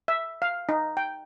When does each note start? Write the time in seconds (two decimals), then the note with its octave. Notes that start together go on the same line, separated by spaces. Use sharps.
0.08 E5
0.42 F5
0.69 D#4
0.97 G5